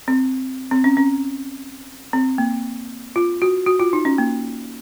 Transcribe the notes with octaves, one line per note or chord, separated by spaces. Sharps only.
C4
C4
C#4
C#4
C4
A#3
F4
F#4
F#4
F4
D#4
C#4
A#3